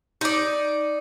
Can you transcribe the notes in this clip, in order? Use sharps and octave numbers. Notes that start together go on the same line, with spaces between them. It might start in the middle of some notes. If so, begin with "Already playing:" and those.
D#4 D5